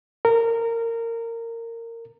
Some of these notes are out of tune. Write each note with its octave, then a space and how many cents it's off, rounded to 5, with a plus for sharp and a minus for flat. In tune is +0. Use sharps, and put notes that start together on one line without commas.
A#4 -20